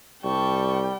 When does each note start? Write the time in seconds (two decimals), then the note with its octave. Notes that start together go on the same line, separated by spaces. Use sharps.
0.24 C2 G3 G5 A5 C#6